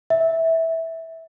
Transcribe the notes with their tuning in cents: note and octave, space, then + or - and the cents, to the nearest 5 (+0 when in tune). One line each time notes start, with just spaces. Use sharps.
E5 -15